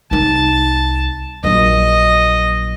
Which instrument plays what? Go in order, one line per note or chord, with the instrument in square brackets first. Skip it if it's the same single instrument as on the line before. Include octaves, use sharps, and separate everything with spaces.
[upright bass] C2 D#4 [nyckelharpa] A5
[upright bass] A#1 F#3 [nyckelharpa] D#5